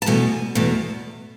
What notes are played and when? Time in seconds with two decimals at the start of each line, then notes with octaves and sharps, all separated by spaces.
0.02 A5
0.06 E2 B2 A3 G#5
0.55 E2 B2 A3